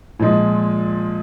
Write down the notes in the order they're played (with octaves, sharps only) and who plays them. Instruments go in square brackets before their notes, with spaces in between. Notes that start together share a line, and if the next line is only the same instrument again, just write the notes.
[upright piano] A#2 F3 G#3